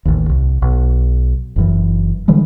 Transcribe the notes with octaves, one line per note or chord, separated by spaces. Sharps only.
A1 D#2
C2
B1
F#1 F#2 E3
D3 E3 G3 G#3